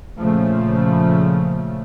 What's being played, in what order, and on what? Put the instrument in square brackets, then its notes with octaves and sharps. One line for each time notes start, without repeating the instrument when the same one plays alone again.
[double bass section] A#2 C#3 F3 A3